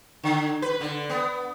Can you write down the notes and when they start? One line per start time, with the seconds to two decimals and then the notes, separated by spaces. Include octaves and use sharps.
0.23 D3
0.62 B4
0.81 D3
1.10 B3